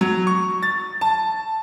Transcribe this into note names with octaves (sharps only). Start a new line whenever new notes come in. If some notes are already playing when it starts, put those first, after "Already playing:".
F#3
C#6
A6
A5